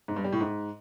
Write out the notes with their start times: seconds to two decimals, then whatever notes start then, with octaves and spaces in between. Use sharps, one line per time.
0.08 G#2
0.16 G2
0.24 G3
0.32 A2
0.41 G#2